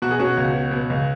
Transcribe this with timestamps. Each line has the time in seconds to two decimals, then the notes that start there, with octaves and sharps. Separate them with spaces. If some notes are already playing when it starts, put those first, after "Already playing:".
0.02 B2 F#4
0.11 G#4
0.19 B2 C#4 F#4
0.37 C#2
0.55 B2
0.71 B2
0.90 C#2